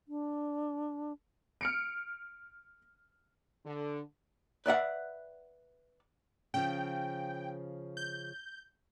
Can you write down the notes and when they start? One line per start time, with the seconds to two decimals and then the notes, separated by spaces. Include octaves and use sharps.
0.08 D4
1.61 F6 C#7 D7
3.65 D3
4.66 B4 D5 E5 F#5
6.54 C#3 F3 G5
7.97 G6